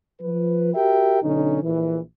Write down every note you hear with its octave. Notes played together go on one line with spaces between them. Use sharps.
F3 B4
F#4 G4 A#4 E5 G5
B1 D3 C#4 D#4
A#1 E3